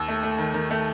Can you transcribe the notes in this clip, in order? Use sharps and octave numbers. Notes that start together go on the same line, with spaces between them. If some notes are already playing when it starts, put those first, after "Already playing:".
Already playing: D#2 E6
A3
A3
D#3
D#3
A3